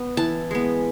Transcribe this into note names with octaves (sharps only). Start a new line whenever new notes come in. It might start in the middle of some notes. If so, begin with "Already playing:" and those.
Already playing: B3
E3 A5
G#3 B3